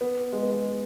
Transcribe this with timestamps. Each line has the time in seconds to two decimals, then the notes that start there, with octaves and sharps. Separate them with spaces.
0.01 B3
0.33 G#3
0.42 B3
0.51 G#3